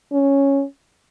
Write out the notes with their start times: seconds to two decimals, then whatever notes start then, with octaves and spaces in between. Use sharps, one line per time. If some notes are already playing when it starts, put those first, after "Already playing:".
0.13 C#4